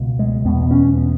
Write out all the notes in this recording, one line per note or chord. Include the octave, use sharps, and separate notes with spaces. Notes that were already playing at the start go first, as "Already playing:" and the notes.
Already playing: C#2 B2
G#3
E2 B2 B3
C#4
B3